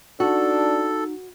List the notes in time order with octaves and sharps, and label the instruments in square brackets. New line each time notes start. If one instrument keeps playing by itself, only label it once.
[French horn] D4 [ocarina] D#4 [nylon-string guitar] F#4 [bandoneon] A4